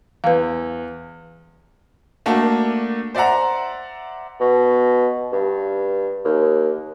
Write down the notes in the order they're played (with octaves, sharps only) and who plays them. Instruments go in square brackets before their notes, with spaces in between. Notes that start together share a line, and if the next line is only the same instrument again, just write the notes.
[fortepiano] E2 [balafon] B4 F5
[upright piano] A3 A#3 D4 F#4
C5 D5 E5 F#5 A#5
[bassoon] B2
G2
D#2